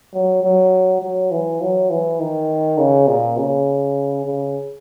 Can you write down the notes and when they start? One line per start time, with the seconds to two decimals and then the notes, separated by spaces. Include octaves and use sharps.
0.14 F#3
0.43 F#3
1.02 F#3
1.31 E3
1.61 F#3
1.90 E3
2.20 D#3
2.78 C#3
3.08 A#2
3.37 C#3
4.25 C#3